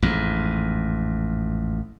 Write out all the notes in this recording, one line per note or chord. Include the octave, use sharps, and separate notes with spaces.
A1 F2 G#2